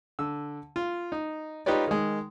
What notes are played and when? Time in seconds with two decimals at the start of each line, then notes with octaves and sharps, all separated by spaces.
0.19 D3 E6
0.76 F4
1.12 D#4
1.66 D#4 F4 G4 B4 C#5 D5
1.88 D#3 G#3